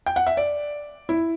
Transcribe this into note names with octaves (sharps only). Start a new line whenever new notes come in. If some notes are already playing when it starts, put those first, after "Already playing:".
G5
F#5
E5
D5
E4